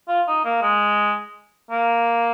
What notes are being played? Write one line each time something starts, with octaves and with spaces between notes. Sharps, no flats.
F4
D#4
A#3
G#3
A#3